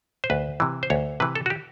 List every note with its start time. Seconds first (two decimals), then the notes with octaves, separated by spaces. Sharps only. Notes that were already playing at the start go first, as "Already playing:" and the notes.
0.24 C5
0.30 D2 B4
0.60 C3 E3
0.83 C5
0.90 D2 C#5
1.20 C3 E3 B4
1.35 A4
1.46 F#4
1.50 G4